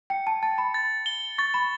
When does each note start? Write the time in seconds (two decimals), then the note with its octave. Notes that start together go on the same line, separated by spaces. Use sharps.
0.10 G5 C#7
0.27 A5
0.43 A5 A6
0.58 B5
0.74 A6
1.06 G7
1.38 C#6 A6
1.54 B5